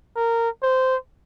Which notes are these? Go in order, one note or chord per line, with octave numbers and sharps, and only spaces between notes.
A#4
C5